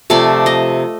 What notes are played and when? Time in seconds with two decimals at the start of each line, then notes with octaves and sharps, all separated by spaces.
0.10 C3 F3 A3 D5
0.46 D#5